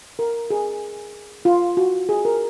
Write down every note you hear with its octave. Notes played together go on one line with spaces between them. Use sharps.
A#4
G#4
F4
F#4
G#4
A#4